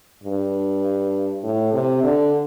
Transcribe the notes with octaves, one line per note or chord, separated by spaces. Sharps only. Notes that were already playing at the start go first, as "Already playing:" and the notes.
G2
A2
C3
D3